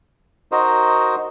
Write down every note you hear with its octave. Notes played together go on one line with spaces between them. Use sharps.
D#4 F#4 A#4 C5 D#5